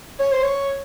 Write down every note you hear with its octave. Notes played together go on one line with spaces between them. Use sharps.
C#5
C5
C#5